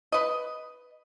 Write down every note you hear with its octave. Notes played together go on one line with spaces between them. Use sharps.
B4 D#5